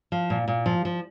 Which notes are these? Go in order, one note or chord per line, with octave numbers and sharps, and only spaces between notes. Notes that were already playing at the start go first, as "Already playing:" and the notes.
F3
A#2
A#2
F3
F3